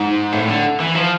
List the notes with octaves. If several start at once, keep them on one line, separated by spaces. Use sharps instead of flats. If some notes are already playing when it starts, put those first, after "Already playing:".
Already playing: G#2
A2
D3
E3
F3